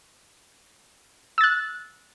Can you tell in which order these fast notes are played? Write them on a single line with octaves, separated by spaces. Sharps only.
E6 A6 F#6